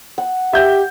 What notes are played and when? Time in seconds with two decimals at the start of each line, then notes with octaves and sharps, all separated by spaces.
0.18 F#5
0.53 G4 E5 G6